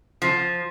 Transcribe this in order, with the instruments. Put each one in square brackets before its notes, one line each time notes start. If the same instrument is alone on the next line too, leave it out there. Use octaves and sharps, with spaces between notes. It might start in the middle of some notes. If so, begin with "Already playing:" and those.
[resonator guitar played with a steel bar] F3